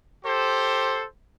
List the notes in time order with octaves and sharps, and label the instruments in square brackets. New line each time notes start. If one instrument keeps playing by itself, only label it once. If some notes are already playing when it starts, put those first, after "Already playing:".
[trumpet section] G4 A4 C5